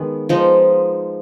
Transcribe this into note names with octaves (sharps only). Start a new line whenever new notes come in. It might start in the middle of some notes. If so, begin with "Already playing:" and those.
Already playing: D#3 G#3 B3
F3 G#3 D#4